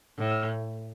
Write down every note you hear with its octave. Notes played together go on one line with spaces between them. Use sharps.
A2